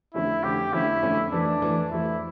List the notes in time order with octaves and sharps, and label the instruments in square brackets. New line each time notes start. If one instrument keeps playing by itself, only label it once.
[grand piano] F2 D3 A3 C#4 [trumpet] E4
[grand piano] F2 D3 A3 C#4 [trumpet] G4
[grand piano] F2 D3 A3 C#4 [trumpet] E4
[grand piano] F2 D3 A3 C#4
[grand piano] F2 E3 A3 [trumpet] D4
[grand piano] F2 E3 A3
[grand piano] F2 E3 A3 [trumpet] E4